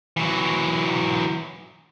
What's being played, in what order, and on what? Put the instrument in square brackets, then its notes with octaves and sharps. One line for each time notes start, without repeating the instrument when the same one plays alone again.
[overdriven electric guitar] E3 F#3